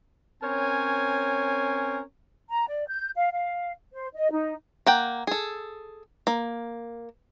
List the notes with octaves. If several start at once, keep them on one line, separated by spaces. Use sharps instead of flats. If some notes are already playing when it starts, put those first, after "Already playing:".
C4 C#4 A#4 C#5 G#5
A#5
D5
G6
F5
F5
C5
D#5
D#4
A#3 F#5 G5
G#4 A4
A#3